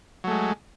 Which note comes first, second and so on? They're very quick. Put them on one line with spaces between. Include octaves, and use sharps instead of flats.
F#3 A3 G#3